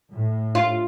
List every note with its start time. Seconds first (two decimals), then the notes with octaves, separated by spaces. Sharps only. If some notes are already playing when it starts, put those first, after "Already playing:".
0.11 A2
0.55 F4